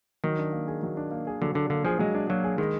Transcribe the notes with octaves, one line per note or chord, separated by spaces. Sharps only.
D#3 F#3
D4
A#3
G#4
F#3
D4
A#3
G#4
D3 F#3
D3 D4
D3 A#3
F3 G#4
F#3 G#3
D4
F#3 A#3
G#4
D#3 G#3